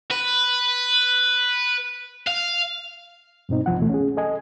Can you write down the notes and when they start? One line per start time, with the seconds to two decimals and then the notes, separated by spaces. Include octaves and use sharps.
0.11 B4
2.27 F5
3.49 G2 B2 C4 D#4
3.66 C2 G2 F3 F#5
3.78 D2 B2 E3 A3
3.89 C#4 G#4
4.17 A4 D#5 G#5